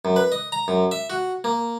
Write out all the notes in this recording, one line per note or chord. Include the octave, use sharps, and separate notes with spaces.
F#2
B4
D#5
A#5
F#2
E5
F#4
A#3